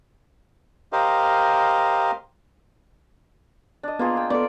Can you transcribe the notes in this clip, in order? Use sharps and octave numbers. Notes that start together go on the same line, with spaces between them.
G4 A#4 C5 D#5 F5
D4 D#5
A#3 B3 F4 G#4 G#5
G5 C6
B3 A4 D5